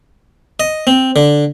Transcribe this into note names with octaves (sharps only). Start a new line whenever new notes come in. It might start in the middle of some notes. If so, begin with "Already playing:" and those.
D#5
C4
D3